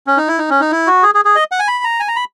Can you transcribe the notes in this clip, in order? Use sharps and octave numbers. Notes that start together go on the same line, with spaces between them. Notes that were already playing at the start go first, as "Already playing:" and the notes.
C#4
D#4
E4
D#4
C#4
D#4
E4
F#4
G#4
G#4
G#4
D#5
F#5
G#5
B5
A#5
G#5
A#5
B5